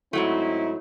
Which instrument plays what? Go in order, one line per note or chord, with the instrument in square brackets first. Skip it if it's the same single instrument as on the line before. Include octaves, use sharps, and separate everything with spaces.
[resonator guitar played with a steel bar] G#2 F#3 A3 [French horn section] C4 D#4 E4